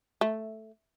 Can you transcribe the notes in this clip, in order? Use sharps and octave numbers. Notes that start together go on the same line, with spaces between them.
A3